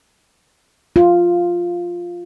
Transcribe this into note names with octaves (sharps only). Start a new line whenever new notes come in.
F4